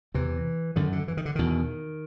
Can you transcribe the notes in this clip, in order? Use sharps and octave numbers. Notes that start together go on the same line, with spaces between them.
E2 C3 E3
F#2 D3 D#3
D3
E3
D#3
D3
E2 B2 D#3